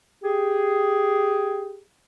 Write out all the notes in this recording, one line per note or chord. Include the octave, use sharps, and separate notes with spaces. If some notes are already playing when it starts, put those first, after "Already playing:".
G4 G#4